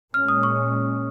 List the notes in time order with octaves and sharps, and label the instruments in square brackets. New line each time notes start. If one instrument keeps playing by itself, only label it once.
[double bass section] A#2 G#3 C#4 [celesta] F6
[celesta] D#6
C#6